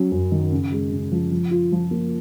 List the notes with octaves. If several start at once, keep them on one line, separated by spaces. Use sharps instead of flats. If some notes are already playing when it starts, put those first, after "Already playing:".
Already playing: F#3 C#4
F#2
D#3
C#3
G#3
C#3
F3
F3
F4
F3
A#3